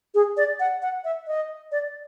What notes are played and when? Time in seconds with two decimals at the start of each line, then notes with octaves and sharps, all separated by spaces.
0.15 G#4
0.37 D5
0.60 F#5
0.82 F#5
1.04 E5
1.27 D#5
1.72 D5